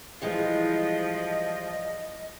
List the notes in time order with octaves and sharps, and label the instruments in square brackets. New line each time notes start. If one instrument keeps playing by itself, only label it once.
[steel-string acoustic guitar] E3 G3 G#3 [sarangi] F3 [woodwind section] D#5